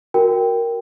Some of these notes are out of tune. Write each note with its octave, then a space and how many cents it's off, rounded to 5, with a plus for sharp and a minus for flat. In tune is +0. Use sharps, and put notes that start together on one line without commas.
F#4 +0 A#4 +0 G5 +0